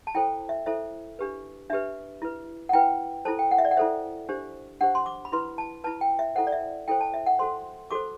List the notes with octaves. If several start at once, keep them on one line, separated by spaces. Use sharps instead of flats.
A5
E4 A4 C5 G5
E5
E4 A4 C5 E5
D4 G4 B4
D4 G4 B4 E5
E4 B4
F#5
E4 B4 G5
E4 A4 C5 A5
G5
F#5
E5
D5
F#5
E4 A4 C5 E5
D4 G4 C5
D4 G4 C5 F#5
C6
D6
B5
E4 B4 C6
A5
E4 B4 A5
G5
E5
E4 A4 C5 F#5
D5
E5
E4 A4 C5 G5
A5
E5
F#5
F#4 A4 C5 C6
F#4 A4 C5 D6